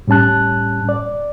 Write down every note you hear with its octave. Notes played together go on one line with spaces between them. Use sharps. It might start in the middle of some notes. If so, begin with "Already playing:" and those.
A2 G3 C#4 A5 F#6
D5